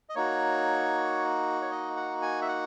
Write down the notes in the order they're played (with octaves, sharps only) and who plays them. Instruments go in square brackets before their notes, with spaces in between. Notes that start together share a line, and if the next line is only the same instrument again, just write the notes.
[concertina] D#5
A#3 D#4 F#4 C#5
C#5
D#5
F#5
G#5
E5
F#5